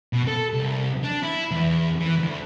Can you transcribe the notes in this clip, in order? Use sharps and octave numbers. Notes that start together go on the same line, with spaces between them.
B2
A4
C2
D4
E4
E2
E3
D2